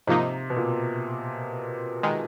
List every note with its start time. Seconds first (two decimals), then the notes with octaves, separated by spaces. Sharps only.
0.07 G#2 C3 F3 A#3 D#4
0.50 B2
0.57 A#2
2.03 D#3 G#3